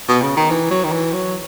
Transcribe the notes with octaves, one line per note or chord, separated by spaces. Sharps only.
B2
C#3
D#3
E3
F#3
D#3
E3
F#3